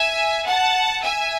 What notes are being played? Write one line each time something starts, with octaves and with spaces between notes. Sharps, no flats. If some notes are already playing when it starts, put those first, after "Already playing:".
Already playing: E5 G#5
F#5 A5
E5 G#5